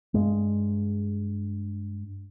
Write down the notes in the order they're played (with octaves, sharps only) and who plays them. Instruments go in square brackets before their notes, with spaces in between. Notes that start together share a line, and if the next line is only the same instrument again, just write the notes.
[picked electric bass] G2 G#3